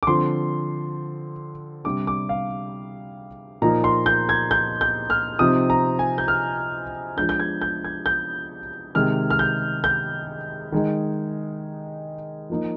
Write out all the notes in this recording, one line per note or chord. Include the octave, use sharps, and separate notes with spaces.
D6
D3 F3 C4 C6
C3 G3 D4 D6
D6
F5
A#2 F3 A#3 D#4 A#5
C6
G6
G#6
G6
G6
F6
C3 F3 C4 D#4 D#6
A#5
G#5
G6
F6
F3 G#3 D4 G6
G6
G#6
G6
G#6
G6
C3 D#3 G#3 F6
F6
G6
G6
D#3 G#3 D#4
F3 A#3 D#4